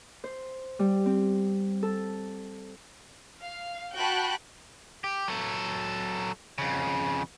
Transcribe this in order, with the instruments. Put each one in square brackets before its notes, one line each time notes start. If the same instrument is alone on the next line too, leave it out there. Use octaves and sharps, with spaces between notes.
[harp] C5
G3
C4
A4
[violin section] F5
F#4 G5 A5 B5 F#6
[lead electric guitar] G4
F#3 A4
F2 C#3